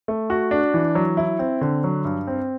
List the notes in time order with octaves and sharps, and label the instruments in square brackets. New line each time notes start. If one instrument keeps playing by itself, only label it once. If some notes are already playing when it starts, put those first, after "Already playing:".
[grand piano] A3
F#4
D4
E3
F#3
E4
C4
D3
F#3
G2
C4